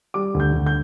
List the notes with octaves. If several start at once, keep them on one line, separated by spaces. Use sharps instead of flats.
G3 D6
D2
G6
D2
G6